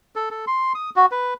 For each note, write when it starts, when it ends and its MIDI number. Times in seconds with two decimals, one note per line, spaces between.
0.16 0.30 69
0.31 0.45 69
0.47 0.73 84
0.75 0.90 87
0.96 1.06 66
1.11 1.34 71